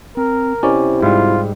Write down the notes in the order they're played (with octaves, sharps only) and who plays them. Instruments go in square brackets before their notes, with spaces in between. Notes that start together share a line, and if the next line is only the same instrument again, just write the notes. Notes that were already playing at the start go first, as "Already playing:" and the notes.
[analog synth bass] C4 [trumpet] A#4
[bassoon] C3 [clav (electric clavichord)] C#4 D5 [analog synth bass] E4
[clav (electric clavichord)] G#2 G3 [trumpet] F4